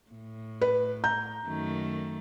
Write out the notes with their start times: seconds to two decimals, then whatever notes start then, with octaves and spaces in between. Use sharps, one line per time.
0.10 A2
0.62 B4
1.04 A#5 G6
1.46 F#2 D#3 A3